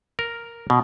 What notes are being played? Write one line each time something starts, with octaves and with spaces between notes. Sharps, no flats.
A#4
B2